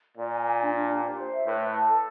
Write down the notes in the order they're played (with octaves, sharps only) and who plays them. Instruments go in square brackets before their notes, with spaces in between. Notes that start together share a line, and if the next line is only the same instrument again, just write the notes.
[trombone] A#2 [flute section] D5
[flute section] G#5
G#5
D4
D4
G4
C5
C5
E5
[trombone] A2 [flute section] B4
[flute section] B4
A5
A4